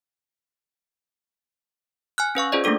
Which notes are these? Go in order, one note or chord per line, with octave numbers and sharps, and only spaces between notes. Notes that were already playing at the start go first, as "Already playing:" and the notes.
G#5 F6 F#6
C#4 B4 F5 C#6
C#4 F4 G#4 C5 D5 D#5
A3 A#3 D4 A4 D6